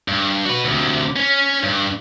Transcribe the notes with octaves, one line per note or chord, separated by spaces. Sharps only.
G2
F#4 B4
D2 C3
C#4
G2